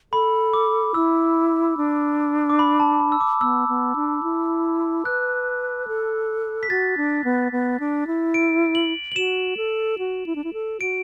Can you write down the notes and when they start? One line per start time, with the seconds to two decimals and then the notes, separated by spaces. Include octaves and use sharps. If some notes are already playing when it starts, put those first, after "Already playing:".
0.13 A4 B5
0.53 D6
0.94 E4 E6
1.77 D4
2.50 D6
2.59 B5
2.80 A5
3.00 B5
3.12 E6
3.20 D6
3.41 B3 E6
3.68 B3
3.96 D4
4.23 E4
5.05 B4 F#6
5.88 A4
6.63 B6
6.70 F#4 A6
6.97 D4
7.24 B3
7.52 B3
7.80 D4
8.07 E4
8.34 D7
8.75 F#7
9.12 F#7
9.16 F#4 E7
9.57 A4
9.98 F#4
10.26 E4
10.36 D4
10.44 E4
10.53 A4
10.81 F#4 D7